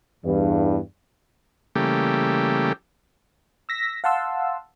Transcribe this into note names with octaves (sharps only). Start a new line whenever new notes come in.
E2 G2
C#3 E3 G3 A3 A#3 G4
E6 A#6 B6
F5 F#5 A5 C6 E6